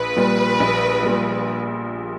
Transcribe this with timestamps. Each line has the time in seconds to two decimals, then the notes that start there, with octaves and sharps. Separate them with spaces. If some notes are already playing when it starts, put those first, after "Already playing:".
Already playing: A#1 B4
0.17 A#2 G3
0.60 A#1
1.03 A#2 G3